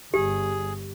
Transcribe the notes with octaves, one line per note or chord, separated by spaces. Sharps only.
G1 G4 G#4